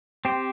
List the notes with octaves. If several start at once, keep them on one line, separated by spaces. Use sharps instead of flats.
C4 G4 C5